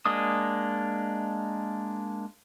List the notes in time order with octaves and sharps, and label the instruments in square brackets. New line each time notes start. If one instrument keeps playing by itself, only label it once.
[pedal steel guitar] G#3 A#3 D4 D#6